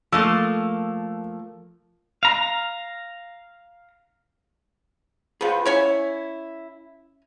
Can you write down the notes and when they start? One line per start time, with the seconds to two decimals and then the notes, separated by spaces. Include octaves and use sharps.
0.12 F3 A3 A#3 E6
2.23 F5 A#5
5.41 F3 B3 G#4 F#5
5.66 C#4 E4 C#5 G#5